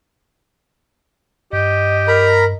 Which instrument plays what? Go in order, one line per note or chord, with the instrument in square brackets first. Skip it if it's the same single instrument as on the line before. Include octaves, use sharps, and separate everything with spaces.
[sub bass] G2 [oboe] G4 [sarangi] D#5
[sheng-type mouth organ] A#4 A#5 B5